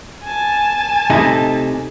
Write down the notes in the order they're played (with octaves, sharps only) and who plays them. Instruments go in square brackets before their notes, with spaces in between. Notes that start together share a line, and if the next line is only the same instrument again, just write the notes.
[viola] G#5 A5
[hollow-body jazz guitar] C3 A3 D#4